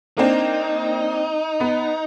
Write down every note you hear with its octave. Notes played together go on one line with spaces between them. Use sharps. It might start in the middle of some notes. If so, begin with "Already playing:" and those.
A#3 C4 D4 D#4
B3